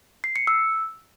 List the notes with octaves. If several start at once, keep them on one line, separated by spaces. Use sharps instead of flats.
C7
C#7
E6